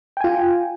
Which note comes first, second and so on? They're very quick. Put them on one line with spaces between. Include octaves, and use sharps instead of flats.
G5 G#5 F4